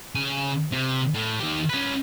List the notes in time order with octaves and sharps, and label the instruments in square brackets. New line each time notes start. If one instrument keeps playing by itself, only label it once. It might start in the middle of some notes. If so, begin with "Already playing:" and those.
[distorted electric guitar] C#3 G#5
C3
A2
D#3 G4
C#4 B4